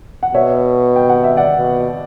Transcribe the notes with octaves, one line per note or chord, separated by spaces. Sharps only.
F#5
B2 C#5 E5
G5
F#5
E5
D5 F#5
B2